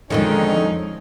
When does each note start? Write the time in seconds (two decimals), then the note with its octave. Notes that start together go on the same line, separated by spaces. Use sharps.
0.10 F2 D3 D#3 F3 G#3 C#4 D#4